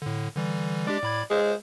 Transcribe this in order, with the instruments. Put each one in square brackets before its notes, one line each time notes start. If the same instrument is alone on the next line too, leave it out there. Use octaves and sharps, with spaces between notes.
[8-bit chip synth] A2 D3
D3 E3 G3
[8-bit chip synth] G#3 D4 G4 [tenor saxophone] D5
[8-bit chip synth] A2 B5 G#6
[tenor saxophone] G#3 [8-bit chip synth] G#4 C5